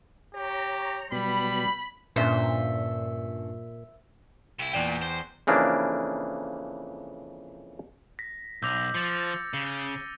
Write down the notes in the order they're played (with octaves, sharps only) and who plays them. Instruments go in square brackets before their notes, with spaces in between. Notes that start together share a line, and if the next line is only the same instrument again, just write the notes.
[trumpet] G4 [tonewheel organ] C#5 A#5
[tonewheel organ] B2 F#3 B3 [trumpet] G3 [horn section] B5
[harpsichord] G2 D3 C#4 [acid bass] A#2 [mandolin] C5 E5
[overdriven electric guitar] C2 E4
[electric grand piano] E2 D5 G5 [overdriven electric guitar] A#2
[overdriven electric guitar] C5
[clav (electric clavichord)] F2 C#3 E3 A#3 D4
[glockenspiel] A#6 [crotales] B6
[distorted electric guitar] B1 [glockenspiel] D6 G6 [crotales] E6 A#6 F7
[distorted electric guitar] F3 [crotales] A6 C#7
[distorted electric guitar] C#3 [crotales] C#7 D#7 G7